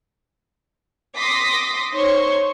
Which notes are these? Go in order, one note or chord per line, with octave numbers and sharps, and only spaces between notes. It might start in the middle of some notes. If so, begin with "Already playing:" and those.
C6 D6 D#6 A#6 B6
D#4 C5 C#5 C6 C#6